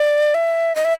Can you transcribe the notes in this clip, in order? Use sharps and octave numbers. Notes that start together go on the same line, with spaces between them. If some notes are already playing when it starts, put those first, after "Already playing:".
Already playing: D5
E5
D#5
E5